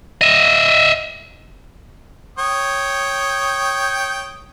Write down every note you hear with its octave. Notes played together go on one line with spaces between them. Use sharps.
D#5 E5
C#5 G5 D#6